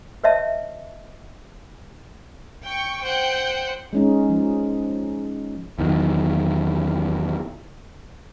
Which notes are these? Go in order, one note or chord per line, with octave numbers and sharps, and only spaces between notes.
B4 C#5 D#5 E5 A5
G5 C#6
C5 F#5 G5 G6
G#3 C#4 D#4
F3
E2 D#3 F#3